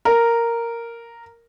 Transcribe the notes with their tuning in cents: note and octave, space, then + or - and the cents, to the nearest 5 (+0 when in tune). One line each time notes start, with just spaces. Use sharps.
A#4 -5